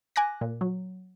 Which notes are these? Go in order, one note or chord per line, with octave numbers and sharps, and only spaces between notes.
G#5 D6 F#6 A#6
A#2
F#3